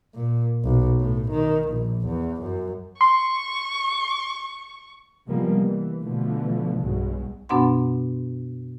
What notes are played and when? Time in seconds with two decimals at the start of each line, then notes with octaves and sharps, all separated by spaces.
0.15 A#2
0.64 B1
1.00 A2
1.31 D#3
1.69 A#1
2.06 E2
2.42 F#2
3.01 C6 C#6
5.27 C3 F3 G3 G#3 A#3 B3
5.62 E3
6.00 B2 D3 E3 F3 A3
6.79 B1 G2 B2 F#3 G#3
7.49 F#2 B2 B3 D4 F#5 C6